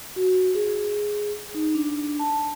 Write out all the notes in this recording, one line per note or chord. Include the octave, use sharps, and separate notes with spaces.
F#4
G#4
D#4
D4
A5